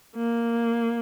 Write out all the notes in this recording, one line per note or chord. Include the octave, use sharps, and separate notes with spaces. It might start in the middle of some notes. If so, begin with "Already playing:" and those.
A#3